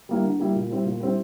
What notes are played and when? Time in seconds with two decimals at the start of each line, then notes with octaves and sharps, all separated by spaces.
0.09 G3 A#3 E4
0.24 D3
0.40 G3 A#3 E4
0.56 A#2
0.70 G3 C4 E4
0.85 A#2
1.00 G3 C4 E4